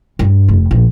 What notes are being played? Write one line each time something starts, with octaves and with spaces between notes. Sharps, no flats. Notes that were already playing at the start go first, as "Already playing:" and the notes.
G2
F1
A#1